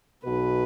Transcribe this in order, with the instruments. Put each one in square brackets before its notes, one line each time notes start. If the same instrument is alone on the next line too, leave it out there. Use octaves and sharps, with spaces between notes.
[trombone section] B1 B2 [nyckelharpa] B4